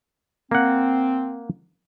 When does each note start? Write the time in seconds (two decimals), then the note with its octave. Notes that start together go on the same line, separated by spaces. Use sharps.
0.51 A#3 C4 F#5